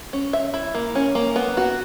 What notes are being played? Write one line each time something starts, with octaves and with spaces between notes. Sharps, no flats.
C#4
E5
E4
A#3
C#4
A#3
B3
F#4